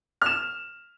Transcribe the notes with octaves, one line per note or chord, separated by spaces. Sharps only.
F6 E7